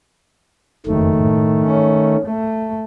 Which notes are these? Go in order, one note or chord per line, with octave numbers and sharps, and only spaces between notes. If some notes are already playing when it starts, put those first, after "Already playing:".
F#1 F2 D#3 A3
A2
C#4
A3